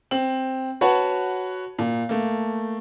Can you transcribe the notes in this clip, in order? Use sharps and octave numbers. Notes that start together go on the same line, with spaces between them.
C4 F#7
F#4 B4 C#5 F#5 A5
A#2
A3 A#3